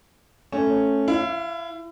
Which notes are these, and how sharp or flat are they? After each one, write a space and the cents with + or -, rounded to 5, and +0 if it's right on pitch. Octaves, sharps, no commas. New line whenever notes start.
A3 +0 C#4 -10
E4 +30 F5 +0